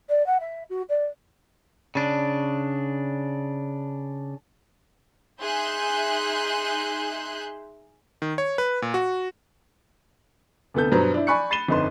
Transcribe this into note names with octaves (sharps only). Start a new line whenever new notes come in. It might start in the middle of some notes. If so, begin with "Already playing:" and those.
D5
F#5
E5
F#4
D5
C#3 D4
D#4 G#4 E5 C6 F#6 G6
D#3
C#5
B4
A#2
F#4
D2 C3 B3 A4 G6
G2 B2 F#3 B3 C5 A#5
D4 E4
D5 G#5 B5 C#6 F#6 C#7
B5 A6 C7 D#7 E7 G7
G1 F2 D#4 B4 C6